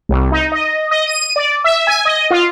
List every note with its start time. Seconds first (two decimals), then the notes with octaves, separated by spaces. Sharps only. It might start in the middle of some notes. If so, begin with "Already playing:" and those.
0.09 C2
0.32 D#4
0.52 D#5
0.91 D#5
1.07 D#7
1.36 D5
1.64 E5
1.87 G#5
2.05 D#5
2.31 F4